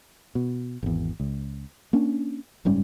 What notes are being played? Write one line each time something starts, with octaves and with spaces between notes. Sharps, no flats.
B2
G#1 E2
C#2
A#3 C#4 D4
F#1 G#2 G3 C#4